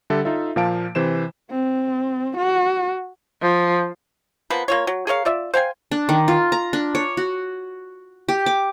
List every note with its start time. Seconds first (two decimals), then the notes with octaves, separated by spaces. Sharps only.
0.10 D3 G3 A4 E5
0.25 D#4 F4 A4 E5
0.56 A#2 F3 A#3 F5 A5 D7
0.95 C3 E3 C5 E7
1.51 C4
2.37 F#4
3.42 F3
4.50 F3 A#3 B3 B4
4.68 A#3 F4 C#5
4.87 F#3
5.07 G#4 A#4 C#5 F5
5.25 F4 D5 E5
5.54 C5 F5 G5 G#5
5.91 D4
6.09 D#3
6.28 F4
6.52 A#5
6.73 D4
6.95 C#5
7.17 F#4
8.29 G4
8.46 D6